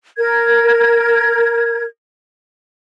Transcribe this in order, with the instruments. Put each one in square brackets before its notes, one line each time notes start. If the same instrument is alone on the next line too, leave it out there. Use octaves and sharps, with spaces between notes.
[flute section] A#4 G#6